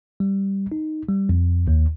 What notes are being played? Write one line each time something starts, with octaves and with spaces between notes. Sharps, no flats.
G3
D#4
G3
F2
D#2